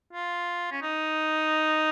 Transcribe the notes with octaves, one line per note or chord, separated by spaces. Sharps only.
F4
C#4
D#4